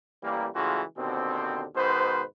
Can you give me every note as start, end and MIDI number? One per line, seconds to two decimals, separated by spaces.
0.23 0.47 33
0.23 0.47 52
0.23 0.47 55
0.23 0.47 58
0.55 0.82 49
0.55 0.82 52
0.55 0.82 56
0.55 0.82 57
0.55 0.82 65
0.55 0.82 66
0.98 1.65 39
0.98 1.65 47
0.98 1.65 50
0.98 1.65 60
1.76 2.22 44
1.76 2.22 47
1.76 2.22 51
1.76 2.22 71
1.76 2.22 72